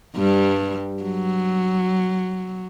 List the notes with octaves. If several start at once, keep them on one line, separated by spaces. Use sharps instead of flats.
G2 G3
F#3